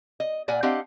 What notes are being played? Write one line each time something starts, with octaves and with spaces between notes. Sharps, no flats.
D#5
A#2 D5 F#5 G#5
C4 D4 G4 D#5 F5 F#5